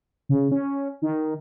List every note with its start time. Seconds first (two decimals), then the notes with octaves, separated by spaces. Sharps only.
0.29 C#3
0.52 C#4
1.02 D#3